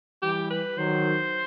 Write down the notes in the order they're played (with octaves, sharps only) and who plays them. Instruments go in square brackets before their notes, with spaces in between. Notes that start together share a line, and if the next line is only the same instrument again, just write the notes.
[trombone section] E3 G3 [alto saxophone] G4
[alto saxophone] B4
[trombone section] D#3 F#3 [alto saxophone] C5